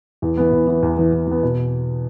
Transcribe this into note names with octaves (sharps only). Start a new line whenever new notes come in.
E2
E3 B3
E2
E3 B3
E2
E3 B3
E2
E3 B3
B2